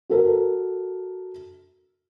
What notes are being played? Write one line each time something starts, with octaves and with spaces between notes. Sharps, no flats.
F#4 A4 A#4